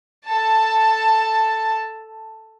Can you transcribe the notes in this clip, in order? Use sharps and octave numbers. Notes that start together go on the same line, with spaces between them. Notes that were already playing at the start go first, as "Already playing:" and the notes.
A4 A5